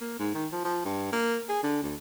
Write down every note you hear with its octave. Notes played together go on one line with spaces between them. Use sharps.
A#3
G#2
D#3
F3
F3
G2
A#3
G#4
D3
D2